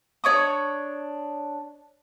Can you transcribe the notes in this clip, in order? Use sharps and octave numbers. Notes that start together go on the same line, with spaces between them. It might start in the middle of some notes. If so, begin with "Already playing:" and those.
D4 C#5 C#6 D#6